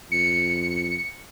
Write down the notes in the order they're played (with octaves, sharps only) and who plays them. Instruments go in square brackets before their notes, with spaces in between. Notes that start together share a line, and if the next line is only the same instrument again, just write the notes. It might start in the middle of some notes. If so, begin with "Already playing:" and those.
[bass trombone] F2 [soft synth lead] C#7